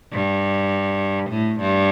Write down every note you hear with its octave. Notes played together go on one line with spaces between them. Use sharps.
G2
A2
G2